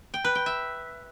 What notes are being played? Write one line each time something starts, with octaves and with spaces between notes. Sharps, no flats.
G5
B4
G5
E5